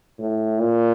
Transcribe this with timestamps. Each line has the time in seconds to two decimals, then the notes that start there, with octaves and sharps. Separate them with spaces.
0.19 A2
0.60 A#2